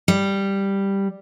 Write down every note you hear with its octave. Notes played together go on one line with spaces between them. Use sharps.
G3